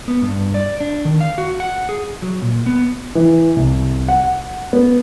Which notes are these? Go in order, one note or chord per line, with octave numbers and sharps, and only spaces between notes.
B3
G2
D5
D4
D#3
F5
F#4
F#5
G#4
F#3
A#2
B3
E3
C2
F#5
B3